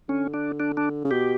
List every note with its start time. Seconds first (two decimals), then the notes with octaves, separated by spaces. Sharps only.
0.09 D3 C#4
0.34 D4
0.60 D4
0.77 D4
1.04 C#3
1.11 B2 G4